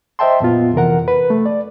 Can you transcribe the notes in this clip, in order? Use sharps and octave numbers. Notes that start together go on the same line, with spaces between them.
C5 D#5 E5 G5 A5 C6
F2 A#2 B3 F4
F2 C3 E3 A#4 F#5
B4
A3
D5